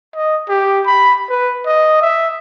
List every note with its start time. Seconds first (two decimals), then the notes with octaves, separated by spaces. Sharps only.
0.15 D#5
0.49 G4
0.86 B5
1.30 B4
1.66 D#5
2.01 E5